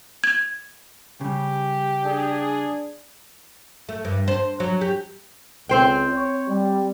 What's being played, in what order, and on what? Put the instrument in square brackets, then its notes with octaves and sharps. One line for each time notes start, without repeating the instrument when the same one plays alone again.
[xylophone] G#6
[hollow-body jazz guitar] C#3 G3 [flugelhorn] G4
[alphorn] D4 [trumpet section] G#4
[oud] A3
G2
C5
F#3
G4
[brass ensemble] C#2 [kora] C4 C5 G5
[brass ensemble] C#5
G3